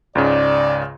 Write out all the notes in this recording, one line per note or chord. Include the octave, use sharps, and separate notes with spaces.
C#2 G#2 C#3 D5